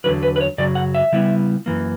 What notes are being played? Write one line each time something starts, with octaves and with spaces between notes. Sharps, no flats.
E2 D3 F#3 B4
B4
B4
C#5
F#2 C#3 F#3 D5
F#5
E5
C#3 G3 B3 E4
F#2 E3 A#3